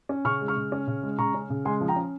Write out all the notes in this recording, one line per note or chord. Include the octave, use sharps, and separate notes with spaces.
C#4
C#3 C#6 F6
G#3
C#6 F6
C#3
C#4
C#3
G#3
C#3 A#5 C#6
C#4
C#3
G#3 G#5 C6
F3
G5 A#5
C#4